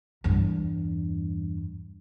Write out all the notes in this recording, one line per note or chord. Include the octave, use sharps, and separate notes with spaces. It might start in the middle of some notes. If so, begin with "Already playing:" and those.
E2 G2